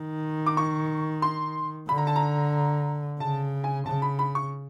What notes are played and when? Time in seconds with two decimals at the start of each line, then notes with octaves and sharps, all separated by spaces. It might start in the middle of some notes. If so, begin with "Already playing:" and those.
Already playing: D#3
0.46 D6
0.57 C#6
1.22 C6
1.89 D3 B5
1.98 A#5
2.07 A5
2.16 A#5
3.20 C#3 A5
3.64 G#5
3.86 C#3 A5
4.02 B5
4.19 B5
4.35 C#6